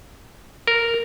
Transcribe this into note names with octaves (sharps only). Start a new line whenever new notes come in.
A#4